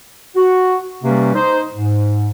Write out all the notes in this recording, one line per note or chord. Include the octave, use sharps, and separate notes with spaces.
F#4
C3 G3 A#3 C#4 B4
D#4 C5
G#2